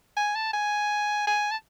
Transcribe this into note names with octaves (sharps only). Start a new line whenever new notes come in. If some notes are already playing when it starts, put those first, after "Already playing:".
G#5
A5
G#5
G#5
A5